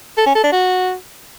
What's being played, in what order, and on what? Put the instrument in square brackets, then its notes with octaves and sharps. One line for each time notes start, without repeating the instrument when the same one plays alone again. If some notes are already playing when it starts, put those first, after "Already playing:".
[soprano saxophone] A4
C#4
A4
D4
F#4